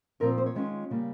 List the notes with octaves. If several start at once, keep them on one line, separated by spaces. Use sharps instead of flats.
A#2 F3 C4 A#4
C5
C#5
D#3 G#3 C#4 F4
C#3 G3 A#3